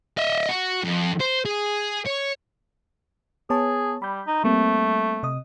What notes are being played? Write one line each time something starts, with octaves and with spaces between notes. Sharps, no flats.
D#5 E5
F#4
F2
C5
G#4
C#5
B3 G#4 C#5 A5
G3 B5 G6
D#4
G3 A3 A#3 C4
C3 D#5 D#6